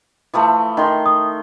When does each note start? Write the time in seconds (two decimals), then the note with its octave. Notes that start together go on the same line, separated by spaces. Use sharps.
0.34 E3 F3 A3
0.77 D#3 C6
1.06 D#6